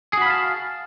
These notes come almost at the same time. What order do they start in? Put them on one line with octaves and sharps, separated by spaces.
G#4 F#4 B5 F5 A5